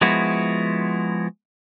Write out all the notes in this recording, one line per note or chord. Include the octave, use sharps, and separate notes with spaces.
F3 G#3 B3 E4 F#4